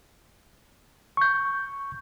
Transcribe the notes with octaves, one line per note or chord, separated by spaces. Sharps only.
C#6 G6